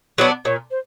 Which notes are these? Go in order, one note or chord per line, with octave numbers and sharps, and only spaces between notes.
F#3 B3 D4 C#5
A#2 C#5
C5